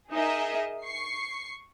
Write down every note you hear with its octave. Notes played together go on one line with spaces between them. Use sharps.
D#4 G#4 A#4 D#5 E5
C#6 C7